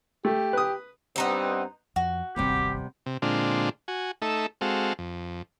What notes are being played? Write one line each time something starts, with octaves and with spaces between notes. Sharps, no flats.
A3 G4
B4 D#6
G2 G3 B3 C4 D#4 C5
F2 F#4
D1 G1 D#2 C3 G3 B3 G4
C3
A#2 D3 G#3 C4 D4 F4
F#4 G#5
A3 D#4 A4 E5
G#3 C4 F#4 A4 F5
F2